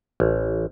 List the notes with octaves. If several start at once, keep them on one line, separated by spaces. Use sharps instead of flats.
A1